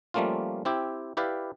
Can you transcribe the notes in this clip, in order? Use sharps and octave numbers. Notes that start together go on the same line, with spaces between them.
F3 G3 A3 A#3 C#4 F4
C4 E4 G4
E4 G4 B4 D5 F5